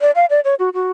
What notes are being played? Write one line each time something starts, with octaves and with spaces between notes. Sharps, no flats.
D5
F5
D5
C#5
F#4
F#4